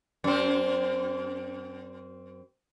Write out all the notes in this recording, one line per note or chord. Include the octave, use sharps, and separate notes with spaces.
F#2 C4